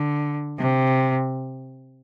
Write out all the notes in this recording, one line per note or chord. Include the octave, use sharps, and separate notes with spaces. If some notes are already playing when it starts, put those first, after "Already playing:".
Already playing: D3
C3